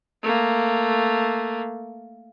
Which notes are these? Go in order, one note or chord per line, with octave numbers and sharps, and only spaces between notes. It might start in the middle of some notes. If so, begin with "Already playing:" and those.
A3 A#3